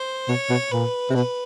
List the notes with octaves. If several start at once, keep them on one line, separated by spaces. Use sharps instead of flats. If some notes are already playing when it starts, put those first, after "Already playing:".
Already playing: C5
B2 C#5
B2
A#2 B4
C3
B2 B4